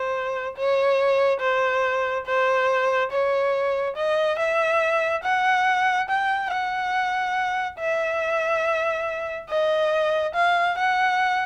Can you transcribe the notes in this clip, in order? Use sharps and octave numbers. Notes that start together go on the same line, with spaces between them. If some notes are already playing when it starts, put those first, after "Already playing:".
Already playing: C5
C#5
C5
C5
C#5
D#5
E5
F#5
G5
F#5
E5
D#5
F5
F#5